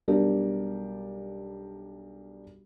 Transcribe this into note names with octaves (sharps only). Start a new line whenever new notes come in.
B1 G3 D4 G4 A#4